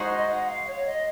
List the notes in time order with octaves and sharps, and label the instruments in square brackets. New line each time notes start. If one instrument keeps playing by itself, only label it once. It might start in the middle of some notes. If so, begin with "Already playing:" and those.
Already playing: [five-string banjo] G#3 D#4 F#4 C5
[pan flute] D#5
F#5
F5
C#5
D#5